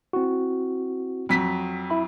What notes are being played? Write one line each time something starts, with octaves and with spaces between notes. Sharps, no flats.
C4 E4 F#4
F2 F#3 B6
E4 E5 B5